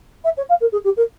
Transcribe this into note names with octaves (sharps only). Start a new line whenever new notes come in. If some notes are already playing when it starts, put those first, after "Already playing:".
E5
C#5
F5
A#4
G#4
G4
A#4